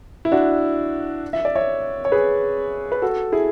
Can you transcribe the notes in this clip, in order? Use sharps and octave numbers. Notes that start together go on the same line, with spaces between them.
E4
D4 F#4
E5
D5
C#5 E5
C#5
G#4 B4
B4
F#4 A4
E4 G#4